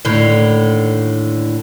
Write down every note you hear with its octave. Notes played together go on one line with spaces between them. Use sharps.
D#2 A2 D3